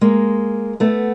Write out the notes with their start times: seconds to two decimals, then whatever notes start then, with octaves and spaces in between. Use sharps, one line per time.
0.01 G#3 A#3
0.80 A3 B3